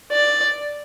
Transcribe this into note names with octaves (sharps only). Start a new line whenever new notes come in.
D5